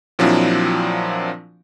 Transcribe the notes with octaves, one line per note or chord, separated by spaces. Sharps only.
A#2 F3 F#3 C4 D4 E4